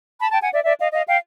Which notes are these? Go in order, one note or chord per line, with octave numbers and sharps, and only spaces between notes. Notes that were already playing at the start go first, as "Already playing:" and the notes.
A5 B5
G5 A5
F#5 G#5
D5 E5
D5 E5
D#5 F5
D#5 F5
F5 G5